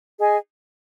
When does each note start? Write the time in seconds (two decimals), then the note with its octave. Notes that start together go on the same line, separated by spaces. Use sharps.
0.20 G#4 D#5 G#5